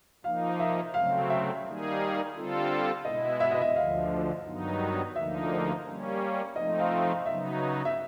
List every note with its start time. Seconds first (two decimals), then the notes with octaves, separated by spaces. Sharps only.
0.24 F3 A#3 D#4 F5
0.60 E5
0.94 C#3 F#3 A3 C4 F5
1.30 E5
1.65 D#3 G3 A#3 D#4 G#4
2.35 D3 G3 C4 F4 A4
3.05 B2 G#3 B3 E4 D#5
3.40 E5
3.51 D#5
3.61 E5
3.75 D2 D3 F3 F5
4.45 G2 D#3 F#3 B3 D#4
5.16 D2 D3 F3 A#3 D#4 E5
5.85 G3 A#3 C#4
6.56 F3 A3 C4 D#4 D#5
6.79 F5
7.02 F5
7.26 C#3 F#3 B3 D#4 E5
7.85 E5